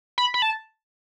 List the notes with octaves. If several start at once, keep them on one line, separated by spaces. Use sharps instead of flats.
B5
B5
A5